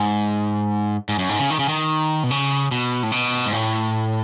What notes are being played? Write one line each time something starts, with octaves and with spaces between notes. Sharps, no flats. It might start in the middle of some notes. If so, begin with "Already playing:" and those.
Already playing: G#2
G#2
F#2
G#2
C#3
D#3
C#3
D#3
B2
C#3
B2
A2
B2
G#2
A2